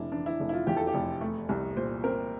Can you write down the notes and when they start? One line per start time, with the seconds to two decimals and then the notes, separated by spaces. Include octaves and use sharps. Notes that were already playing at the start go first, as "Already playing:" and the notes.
Already playing: F1 D4 E4
0.12 E3 D4
0.26 E4
0.40 F1
0.49 E4
0.53 F4
0.67 E2 G4
0.77 A4
0.87 G4
0.94 F1
1.21 A3
1.49 C2
1.76 A#2 C5
2.04 C4 A#4